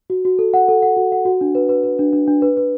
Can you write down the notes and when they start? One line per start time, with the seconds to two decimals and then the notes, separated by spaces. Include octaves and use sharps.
0.10 F#4
0.25 F#4
0.39 A4
0.54 F#5
0.68 A4
0.82 F#5
0.96 F#4
1.12 F#5
1.25 F#4
1.41 D4
1.55 B4
1.69 B4
1.84 B4
1.99 D4
2.13 D4
2.28 D4
2.42 B4
2.57 B4